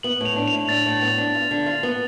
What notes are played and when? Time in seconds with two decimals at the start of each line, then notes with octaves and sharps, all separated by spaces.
0.03 B3 F#7
0.21 A2 F7
0.36 D4
0.48 A2 F7
0.69 D4 A6
0.86 A2
1.01 B3
1.18 D4
1.35 F4
1.51 D3
1.66 F4
1.83 B3